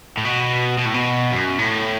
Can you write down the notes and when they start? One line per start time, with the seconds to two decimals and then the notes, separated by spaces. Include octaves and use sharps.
0.18 A2
0.25 B2
0.78 B2
0.86 A2
0.94 B2
1.31 F#2
1.58 A2